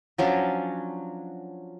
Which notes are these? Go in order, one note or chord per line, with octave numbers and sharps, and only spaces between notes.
F3 F#3 C#4 D4